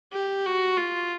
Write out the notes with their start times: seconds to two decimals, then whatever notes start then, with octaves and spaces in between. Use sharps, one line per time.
0.12 G4
0.45 F#4
0.77 F4